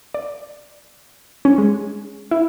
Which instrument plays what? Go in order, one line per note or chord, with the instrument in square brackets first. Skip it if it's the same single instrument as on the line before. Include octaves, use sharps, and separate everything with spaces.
[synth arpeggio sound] D5
C#4
G#3
E4